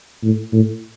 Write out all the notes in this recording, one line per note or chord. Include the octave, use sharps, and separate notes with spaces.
A2
A2